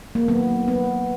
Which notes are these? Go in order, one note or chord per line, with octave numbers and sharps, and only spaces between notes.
A#3
D#3 F#3 A#3 B3
B3